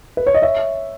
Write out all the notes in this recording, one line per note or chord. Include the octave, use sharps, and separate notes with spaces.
B4
C#5
D#5
C#5 E5